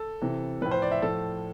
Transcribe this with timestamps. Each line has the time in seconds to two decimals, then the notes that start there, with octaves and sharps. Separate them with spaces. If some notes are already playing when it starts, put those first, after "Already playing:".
Already playing: A4
0.21 C3 E3
0.61 A2 F3 B4
0.71 C5
0.82 D5
0.92 E5
1.02 A2 F3 A4